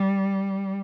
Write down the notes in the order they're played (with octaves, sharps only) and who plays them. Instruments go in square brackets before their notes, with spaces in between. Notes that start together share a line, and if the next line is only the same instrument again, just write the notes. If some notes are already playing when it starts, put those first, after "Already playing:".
Already playing: [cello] G3